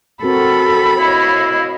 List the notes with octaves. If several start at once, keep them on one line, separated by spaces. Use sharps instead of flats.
C4 F#4 A4 A#4 B5
E4 C#5 D#5 F5